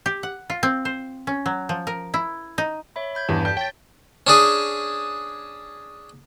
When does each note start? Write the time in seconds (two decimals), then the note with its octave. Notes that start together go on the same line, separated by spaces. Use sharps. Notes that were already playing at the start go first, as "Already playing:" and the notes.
0.06 G4
0.23 F#5
0.50 F4
0.63 C4
0.85 C5
1.27 C#4
1.46 F#3
1.69 F3
1.87 A#4
2.14 E4
2.58 D#4
2.96 C#5 E5 B5
3.15 B5 G6 G#6
3.29 E2 G2 E3 A5
3.45 G5 G6 B6
3.57 C#5 G5 A6
4.27 C#4 D4 G#4